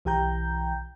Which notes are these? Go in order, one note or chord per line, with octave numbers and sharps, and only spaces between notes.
B1 E3 G4 G5 A#5 G6